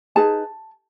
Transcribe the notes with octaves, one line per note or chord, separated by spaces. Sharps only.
D#4 G#4 B4 A5